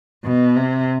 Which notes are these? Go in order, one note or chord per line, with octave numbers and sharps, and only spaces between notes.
B2
C3